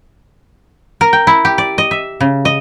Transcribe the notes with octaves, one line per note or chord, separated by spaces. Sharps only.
A#4
G5
E4
G4
D5
D#5
E5
C#3
D#5